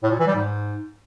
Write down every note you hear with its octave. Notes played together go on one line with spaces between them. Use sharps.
A2
A#2
E3
G3
G#2